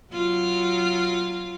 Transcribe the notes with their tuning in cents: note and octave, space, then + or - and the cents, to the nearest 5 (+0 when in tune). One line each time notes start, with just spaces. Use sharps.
F#3 +0 F4 -10